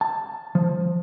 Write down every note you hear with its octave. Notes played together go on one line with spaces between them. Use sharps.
A5
F3